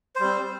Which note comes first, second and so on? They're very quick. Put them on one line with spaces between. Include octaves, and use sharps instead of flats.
C5 G3 C4